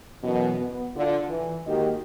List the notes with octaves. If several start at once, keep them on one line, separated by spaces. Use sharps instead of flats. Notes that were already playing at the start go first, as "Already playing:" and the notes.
F#2 B2 E3
B3
D3 F4
E3
G#2 D#3 A#3 F#4 G4 D#5